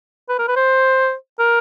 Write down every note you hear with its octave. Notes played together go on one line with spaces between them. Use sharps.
B4
A#4
B4
C5
A#4